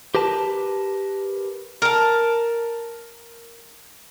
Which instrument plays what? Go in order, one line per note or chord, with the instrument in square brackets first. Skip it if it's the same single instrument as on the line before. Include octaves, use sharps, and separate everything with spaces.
[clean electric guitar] G4 A#4 B4 A5
[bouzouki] A#4 A5